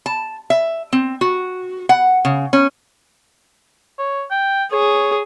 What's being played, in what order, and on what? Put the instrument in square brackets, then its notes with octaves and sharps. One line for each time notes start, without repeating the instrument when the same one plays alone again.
[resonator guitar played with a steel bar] A5
E5
C4
F#4
F#5
C#3
C#4
[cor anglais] C#5
G5
[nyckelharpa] G#4 [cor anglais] C#5